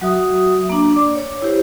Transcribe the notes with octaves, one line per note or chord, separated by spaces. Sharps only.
F#3 F#4 E5 D#6
A#3 D4
D5 D6
C#5
E4 G4 C5